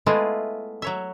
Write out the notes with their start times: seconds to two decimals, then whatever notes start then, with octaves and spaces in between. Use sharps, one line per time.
0.06 G#3 A3 B3 E4 F4
0.82 F#3 C#5 E5